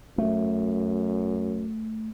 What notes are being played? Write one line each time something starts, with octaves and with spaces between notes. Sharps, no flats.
F#2 A3